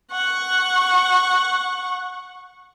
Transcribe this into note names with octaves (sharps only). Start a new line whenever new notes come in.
F#5 C#6